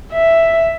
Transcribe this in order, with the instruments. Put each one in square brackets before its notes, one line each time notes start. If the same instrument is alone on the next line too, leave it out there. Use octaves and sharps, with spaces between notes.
[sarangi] E5